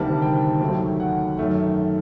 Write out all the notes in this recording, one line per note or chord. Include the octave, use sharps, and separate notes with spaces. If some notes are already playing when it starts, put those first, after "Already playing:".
Already playing: D2 C3 D#3 G3 A#3 A5
G5
D#2 D#3 F#3 A3
F#5
F#2 D#3 A3